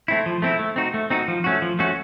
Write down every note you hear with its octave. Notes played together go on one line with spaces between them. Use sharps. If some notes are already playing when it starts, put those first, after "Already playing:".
A3 C4 E4
F3
A3 C4 E4
A3
C4 D#4 F#4
A3
C4 D#4 F#4
F3
A3 C#4 F#4
F3
A3 C#4 F#4